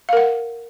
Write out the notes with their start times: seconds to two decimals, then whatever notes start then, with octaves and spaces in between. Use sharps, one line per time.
0.09 F5
0.13 A#4
0.17 F#5